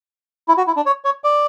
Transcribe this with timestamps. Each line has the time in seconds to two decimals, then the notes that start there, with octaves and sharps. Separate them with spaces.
0.48 E4
0.57 F#4
0.67 E4
0.76 D4
0.86 C#5
1.05 C#5
1.24 D5